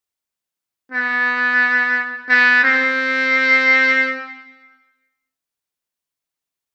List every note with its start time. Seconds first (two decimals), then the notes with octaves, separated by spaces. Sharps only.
0.92 B3
2.29 B3
2.63 C4